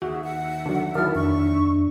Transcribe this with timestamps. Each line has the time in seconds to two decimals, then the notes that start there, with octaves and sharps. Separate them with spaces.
0.02 D#2 F#4 G#4 E5
0.24 F#5
0.66 D3 F#3
0.95 D#3 F#3 E4 A#4 A5 F6
1.15 F2 D4 C#6